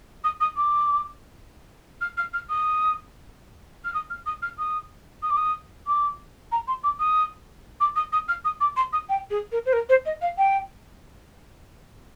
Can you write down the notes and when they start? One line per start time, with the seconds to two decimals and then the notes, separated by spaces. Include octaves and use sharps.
0.24 D#6
0.40 D#6
0.56 D6
2.01 F6
2.17 F6
2.33 F6
2.49 D#6
3.84 F6
3.94 D#6
4.10 F6
4.26 D#6
4.42 F6
4.58 D#6
5.22 D#6
5.30 D6
5.37 D#6
5.87 D6
6.52 A#5
6.67 C6
6.83 D6
6.99 D#6
7.80 D6
7.96 D#6
8.12 D#6
8.28 F6
8.44 D#6
8.60 D6
8.76 C6
8.92 D#6
9.09 G5
9.30 G#4
9.52 A#4
9.65 C5
9.73 A#4
9.89 C5
10.05 D#5
10.21 F5
10.37 G5